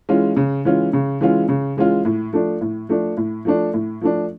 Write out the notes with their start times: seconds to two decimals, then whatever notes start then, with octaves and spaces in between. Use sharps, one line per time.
0.09 E3 G#3 C#4 F4
0.37 C#3
0.65 E3 G#3 C#4 F4
0.93 C#3
1.21 E3 G#3 C#4 F4
1.49 C#3
1.77 E3 G#3 C#4 F4
2.05 A2
2.33 F3 A3 D4
2.61 A2
2.89 F3 A3 D4
3.17 A2
3.45 F3 A3 D4
3.74 A2
4.01 F3 A3 D4